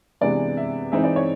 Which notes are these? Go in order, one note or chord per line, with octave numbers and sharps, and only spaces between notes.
C3 E3 G#3 B3 D4 D5
E5
E3 G#3 C4 D#4 E5
D5
C#5